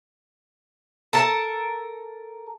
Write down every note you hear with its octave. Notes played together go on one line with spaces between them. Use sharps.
A4 A#4 A5